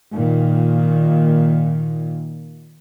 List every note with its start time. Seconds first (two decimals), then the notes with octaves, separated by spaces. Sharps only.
0.14 A#2 D#3